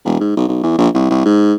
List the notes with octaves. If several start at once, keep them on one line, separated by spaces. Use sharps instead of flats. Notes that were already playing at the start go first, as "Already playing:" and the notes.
E1
G#2
B1
B1
E2
A#1
C2
C2
G#2